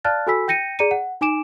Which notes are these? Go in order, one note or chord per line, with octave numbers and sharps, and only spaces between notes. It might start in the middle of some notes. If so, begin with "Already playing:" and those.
D5 F5 A5 F6 F#6 A6
F#4 A4 G#5 B5 E6 B6
G5 G6 A#6 C#7 D#7
G#4 D5 A#5 C#7 D#7
F#5
D#4 G#5 D6 D7 E7